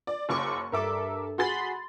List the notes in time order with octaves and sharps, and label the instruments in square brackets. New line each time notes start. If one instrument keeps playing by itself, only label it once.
[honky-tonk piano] D5
[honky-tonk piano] F#1 F#2 D6 [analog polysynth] C#6
[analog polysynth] G2 A4 [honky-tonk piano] A#4 E5 D6
[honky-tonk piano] F#4 G#4 A6 [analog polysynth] B5 C6